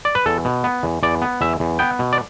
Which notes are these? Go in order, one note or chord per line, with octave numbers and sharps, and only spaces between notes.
D5
B4
E2 A4
B2
B3
E2
E2 D5
B3
E2 E5
E2
B3 G5
B2
D5